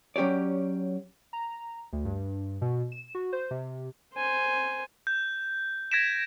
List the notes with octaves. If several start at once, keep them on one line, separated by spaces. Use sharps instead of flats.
F#3 C#4 G4 C#5 D5
A#5
D2
G2
B2
E7
F#4
C5
C3
C5 G#5
G6
G#6 A#6 B6 D7 E7